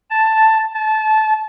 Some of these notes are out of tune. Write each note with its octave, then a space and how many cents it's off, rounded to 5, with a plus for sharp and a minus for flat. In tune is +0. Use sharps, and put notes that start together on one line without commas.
A5 +5
A5 -20